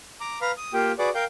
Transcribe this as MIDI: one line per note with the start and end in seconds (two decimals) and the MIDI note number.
0.21 0.39 82
0.21 0.39 86
0.42 0.52 71
0.42 0.52 77
0.42 0.52 82
0.42 0.52 83
0.42 0.52 89
0.57 0.73 87
0.73 0.92 58
0.73 0.92 65
0.73 0.92 67
0.73 0.92 79
0.99 1.09 66
0.99 1.09 68
0.99 1.09 71
0.99 1.09 74
0.99 1.09 78
0.99 1.09 86
1.15 1.24 70
1.15 1.24 77
1.15 1.24 79
1.15 1.24 91